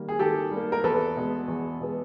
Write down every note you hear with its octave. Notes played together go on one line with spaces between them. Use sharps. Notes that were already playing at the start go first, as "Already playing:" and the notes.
Already playing: D#3 G3 A#3
G#4
D#3 G4 A4
G3 A#3
A#4
E2 A4 B4
B2 G#3 B3
E2
B2 G#3 B3